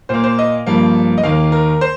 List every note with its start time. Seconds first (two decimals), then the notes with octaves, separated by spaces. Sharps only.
0.09 A#2 A#3 C5
0.24 C5
0.39 D#5
0.66 G2 F3 A#3
1.18 D#5
1.23 D#2 D#3 A#3 F5
1.52 A#4
1.81 C5